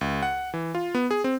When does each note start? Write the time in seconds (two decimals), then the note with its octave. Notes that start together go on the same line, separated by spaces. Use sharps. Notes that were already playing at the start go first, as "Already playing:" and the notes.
0.01 C#2
0.22 F#5
0.54 E3
0.75 F4
0.95 B3
1.11 G#4
1.24 C4